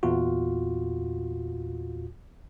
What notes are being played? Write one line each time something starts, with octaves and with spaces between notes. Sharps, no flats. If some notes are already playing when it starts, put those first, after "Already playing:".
E2 A#2 F4 F#4